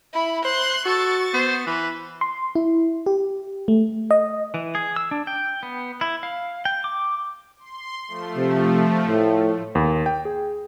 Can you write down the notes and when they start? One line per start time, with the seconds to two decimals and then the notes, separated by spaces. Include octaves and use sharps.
0.13 E4 B5
0.45 C5 C6 F#6
0.86 F#4 A4 C#6 A6
1.34 B3 C5
1.66 E3 B4
2.21 C6
2.55 E4
3.06 G4
3.68 A3
4.11 D#5
4.54 E3
4.75 G#4
4.96 E6
5.11 D4
5.27 G5
5.63 B3
6.01 E4
6.23 F5
6.65 G5
6.84 D6
7.59 C6
8.08 F3 A3
8.37 C3
9.08 A2
9.75 D#2
10.06 G5
10.25 G#4